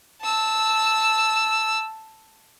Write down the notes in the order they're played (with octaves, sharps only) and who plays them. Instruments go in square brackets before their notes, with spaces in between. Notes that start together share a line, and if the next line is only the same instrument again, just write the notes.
[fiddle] A5 E6